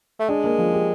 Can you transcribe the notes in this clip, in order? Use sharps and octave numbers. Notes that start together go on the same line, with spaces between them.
A3
G#3 D4
A#3
F3
G4